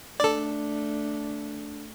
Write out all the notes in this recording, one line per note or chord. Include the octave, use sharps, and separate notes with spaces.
A3 D4 A4 D5